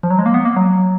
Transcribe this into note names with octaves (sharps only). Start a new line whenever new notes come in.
F3
F#3
G#3
A#3
B3
A#3
F#3